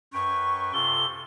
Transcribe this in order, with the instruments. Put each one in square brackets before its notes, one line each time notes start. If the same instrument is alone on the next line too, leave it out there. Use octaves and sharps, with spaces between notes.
[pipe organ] F#2 B4 G5 [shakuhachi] C#6
[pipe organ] C3 F4 A4 [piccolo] G7